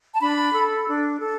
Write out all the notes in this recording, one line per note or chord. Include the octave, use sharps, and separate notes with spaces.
A5
D4 B5
A4
D4
A4